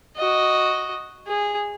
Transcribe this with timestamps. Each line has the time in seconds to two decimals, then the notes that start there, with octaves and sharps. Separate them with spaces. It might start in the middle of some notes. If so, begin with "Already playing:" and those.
0.17 F#4 D#5
1.27 G#4